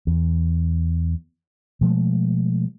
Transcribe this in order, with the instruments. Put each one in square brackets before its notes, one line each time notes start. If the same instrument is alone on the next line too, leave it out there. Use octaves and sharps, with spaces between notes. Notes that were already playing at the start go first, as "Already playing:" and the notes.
[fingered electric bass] E2
B2 F3 G#3 A3